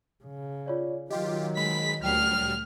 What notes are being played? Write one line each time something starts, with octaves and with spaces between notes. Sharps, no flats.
C#3
F4 C#5 D5
D#3 F#3 F4 G4 D#5
G#3 B5 B6
D2 A#2 F#3 G3 G5 F6 C7